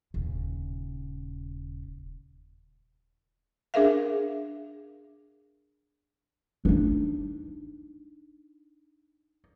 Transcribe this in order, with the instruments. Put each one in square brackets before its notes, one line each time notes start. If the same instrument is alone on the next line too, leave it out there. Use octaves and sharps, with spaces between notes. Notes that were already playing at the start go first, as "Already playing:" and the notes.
[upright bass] D#1 C#3
[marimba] D4 G#4 A#4 E5 F5
[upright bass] D4 D#4